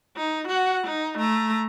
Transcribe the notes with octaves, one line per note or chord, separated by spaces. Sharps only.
D#4
F#4 F#5
D#4
A3 A#5